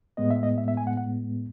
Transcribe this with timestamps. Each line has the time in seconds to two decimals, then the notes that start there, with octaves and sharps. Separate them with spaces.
0.17 A2 G#3 B3 D#5
0.31 E5
0.43 D#5
0.58 E5
0.68 E5
0.77 G#5
0.87 F#5
0.97 F#5